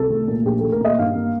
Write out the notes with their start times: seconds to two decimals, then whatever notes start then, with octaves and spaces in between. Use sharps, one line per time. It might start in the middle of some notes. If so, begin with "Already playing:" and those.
Already playing: C2 A4
0.10 A3
0.28 A#2
0.45 A#1 G4
0.59 A4
0.64 A3
0.72 A#4
0.81 A#2 D#5
0.99 G2 F5
1.16 A#3